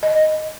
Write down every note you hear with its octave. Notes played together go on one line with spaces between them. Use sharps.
D#5